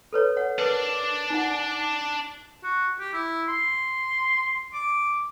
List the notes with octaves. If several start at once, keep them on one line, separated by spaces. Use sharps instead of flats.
A4 B4 C#5
C#5 F#5
D4 A#4 B4 D5
D#4 F#5
F#4
G4
E4
C6
D6